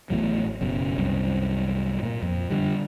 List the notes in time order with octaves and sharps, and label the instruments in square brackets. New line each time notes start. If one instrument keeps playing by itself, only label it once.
[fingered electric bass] A1 E2 A2 F#3
F#1 F#2 B2
C2 F#2
A#2 A#3
F2
D3 G3